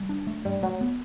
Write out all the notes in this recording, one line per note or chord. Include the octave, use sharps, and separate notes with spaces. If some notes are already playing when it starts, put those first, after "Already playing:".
Already playing: G3
D4
A3
G2 G3
F#3 A3
B3